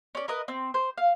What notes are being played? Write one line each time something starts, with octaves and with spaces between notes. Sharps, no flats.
C#4 D5
A#4 B4 D#5
C4
C5
F5